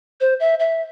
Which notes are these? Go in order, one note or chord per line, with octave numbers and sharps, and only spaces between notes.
C5
E5
E5